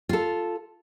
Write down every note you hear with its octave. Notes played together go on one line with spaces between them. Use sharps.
F4 A4